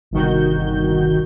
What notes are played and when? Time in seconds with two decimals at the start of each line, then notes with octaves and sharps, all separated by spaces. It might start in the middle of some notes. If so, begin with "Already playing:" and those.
0.11 G1 C2 D#3 F#4 G6